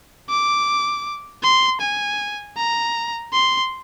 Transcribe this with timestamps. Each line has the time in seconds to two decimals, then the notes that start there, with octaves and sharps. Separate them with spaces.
0.29 D6
1.43 C6
1.81 G#5
2.57 A#5
3.33 C6